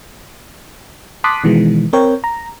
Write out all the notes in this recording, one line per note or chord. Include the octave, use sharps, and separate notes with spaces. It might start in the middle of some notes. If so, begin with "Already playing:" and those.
A5 C6 D6 D#6 F#6 B6
B2 D#3 E3 G#3
C4 A#4 C#5 G5
A#5